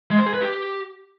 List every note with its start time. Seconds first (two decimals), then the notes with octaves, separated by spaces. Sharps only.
0.11 G#3
0.19 C5
0.26 G#4
0.34 B4
0.42 G4